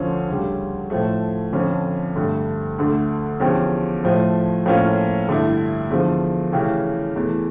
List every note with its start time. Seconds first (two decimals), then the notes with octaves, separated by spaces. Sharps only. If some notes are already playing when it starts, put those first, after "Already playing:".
Already playing: D2 D3 F3 C#4
0.28 D2 C#3 G3
0.90 A2 F3 A3
1.53 F2 D3 F3 C#4
2.16 G2 D3 A3
2.79 D2 D3 A3
3.40 E2 D3 F3 C#4 G4
4.03 A2 F3 A3
4.66 A2 F3 A#3 C#4 F4
5.28 G2 D3 A3 E4
5.90 E2 D3 F3
6.52 C#3 E3 A3 C#4 G4
7.15 E2 E3 A3